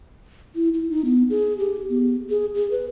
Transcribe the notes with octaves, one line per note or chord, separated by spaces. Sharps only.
E4
E4
D#4
B3
G#4
G4
B3
G#4
G#4
B4